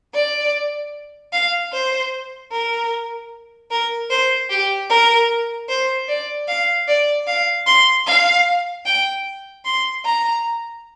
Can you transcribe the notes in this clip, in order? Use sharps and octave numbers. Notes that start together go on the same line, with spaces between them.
D5
F5
C5
A#4
A#4
C5
G4
A#4
C5
D5
F5
D5
F5
C6
F5
G5
C6
A#5